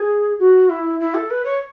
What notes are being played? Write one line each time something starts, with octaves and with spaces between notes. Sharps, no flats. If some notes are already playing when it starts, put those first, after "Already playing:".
Already playing: G#4
F#4
E4
E4
A4
B4
C#5